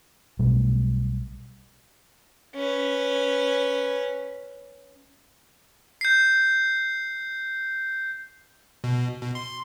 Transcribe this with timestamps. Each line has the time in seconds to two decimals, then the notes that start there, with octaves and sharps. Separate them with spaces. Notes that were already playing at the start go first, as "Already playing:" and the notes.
0.39 B1 B2 G3 A3
2.54 C#4 B4
6.01 G6 C7
8.84 B2
9.22 B2
9.35 C6